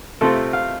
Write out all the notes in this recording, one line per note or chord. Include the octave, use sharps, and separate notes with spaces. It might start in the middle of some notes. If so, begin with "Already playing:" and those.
C3 A3 C4 F4 A4
F5